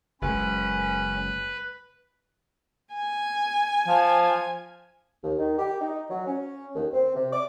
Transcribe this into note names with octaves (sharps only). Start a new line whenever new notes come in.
F#1 G#3 C#4 B4
G#5
F3
D#2
D#3
G4
D#4
F#3
C#4
D#2
C4
C3
D6